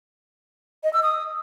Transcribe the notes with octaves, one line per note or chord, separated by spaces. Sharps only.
D#5
E6
D#6